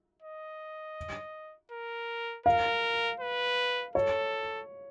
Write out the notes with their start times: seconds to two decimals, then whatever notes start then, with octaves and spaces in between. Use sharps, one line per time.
0.22 D#5
1.72 A#4
2.46 A#4 F5
3.20 B4
3.95 A4 C#5